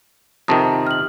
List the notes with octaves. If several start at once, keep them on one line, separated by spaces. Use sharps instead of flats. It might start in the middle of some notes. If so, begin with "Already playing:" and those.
F2 C3 D#3 A5 A#5 D#6
F6 F#7